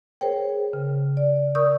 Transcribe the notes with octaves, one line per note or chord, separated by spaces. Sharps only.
G#4 A#4 C5 C#5 G5
C#3
D5
A#4 D5 C#6 D#6 E6 G6